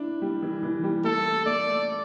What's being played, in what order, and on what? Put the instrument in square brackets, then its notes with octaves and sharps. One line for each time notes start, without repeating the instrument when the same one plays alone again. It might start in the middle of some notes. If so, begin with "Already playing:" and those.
Already playing: [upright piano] D4 E4
G3
E3
E3
G3
[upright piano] A3 [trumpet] A4
[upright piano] A3 [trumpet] D5